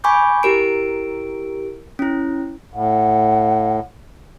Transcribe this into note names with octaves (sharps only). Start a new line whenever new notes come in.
G#5 B5 C#6 D6 G6
E4 G4 A#4 D7
C#4 E4
A2 F#5